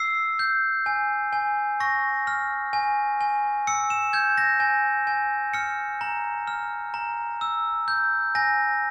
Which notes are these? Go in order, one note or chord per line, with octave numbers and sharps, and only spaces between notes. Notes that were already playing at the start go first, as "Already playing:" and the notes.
Already playing: E6 C7
G6
G#5
G#5
C#6 A#6
F6
G#5
G#5
E6 C#7
E7
G6 G#6
A#6
G#5
G#5
F6 C#7
A#5
F6
A#5
E6
G6
G#5 A#6